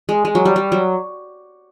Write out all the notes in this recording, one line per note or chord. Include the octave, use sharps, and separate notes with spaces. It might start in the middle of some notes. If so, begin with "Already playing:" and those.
G#3
G#3
F#3
G3
G3
F#3